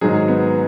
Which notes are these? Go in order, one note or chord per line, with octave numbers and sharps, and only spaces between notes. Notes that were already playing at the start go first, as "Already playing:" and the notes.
G#2 D#3 F#3 G#4
B3